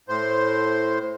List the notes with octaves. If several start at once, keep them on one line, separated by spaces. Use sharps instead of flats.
A2 C5